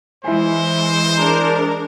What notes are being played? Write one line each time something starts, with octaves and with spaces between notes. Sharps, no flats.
E3 G#3 E4 C5 G#5
D4 G#4 A#4